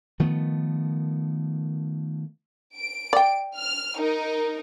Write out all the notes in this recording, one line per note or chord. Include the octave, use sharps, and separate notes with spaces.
D#3 F3 A3 B3
D7
D5 G5
F6
D#4 A#4